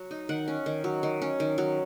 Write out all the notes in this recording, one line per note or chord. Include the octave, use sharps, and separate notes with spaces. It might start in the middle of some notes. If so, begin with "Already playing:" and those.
Already playing: F#3
D#4
D#3 F#5
C#4
D#3
F#3
D#3
C#4
D#3
F#3